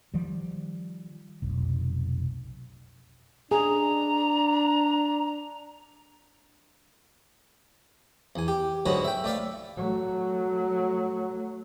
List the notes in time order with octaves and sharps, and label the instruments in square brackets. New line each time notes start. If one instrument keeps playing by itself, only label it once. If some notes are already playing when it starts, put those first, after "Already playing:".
[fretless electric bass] D#3 F3 G3
F1 B1
[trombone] D4 [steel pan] G#4 [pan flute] A#5
[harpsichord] E2 G#5
G4
G#2 D3 F#3 B3 C#4 F#4
E5 G5
A3 D5 E5 F5
[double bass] F#3 A3